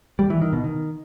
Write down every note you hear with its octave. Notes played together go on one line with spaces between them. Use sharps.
G3
E3
D#3
B2
D#3